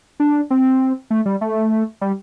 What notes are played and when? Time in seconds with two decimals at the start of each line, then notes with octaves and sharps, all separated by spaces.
0.20 D4
0.50 C4
1.10 A3
1.26 G3
1.41 A3
2.01 G3